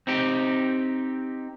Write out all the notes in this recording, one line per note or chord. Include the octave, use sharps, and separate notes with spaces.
C4 D#4 G4